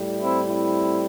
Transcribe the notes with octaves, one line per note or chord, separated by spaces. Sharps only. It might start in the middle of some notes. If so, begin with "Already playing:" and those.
Already playing: A2 G3
C4 E4
C4 E4